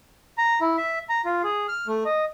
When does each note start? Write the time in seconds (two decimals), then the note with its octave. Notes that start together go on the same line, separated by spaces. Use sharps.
0.38 A#5
0.61 E4
0.78 E5
1.09 A#5
1.25 F4
1.44 G#4
1.68 F6
1.87 A3
2.05 D#5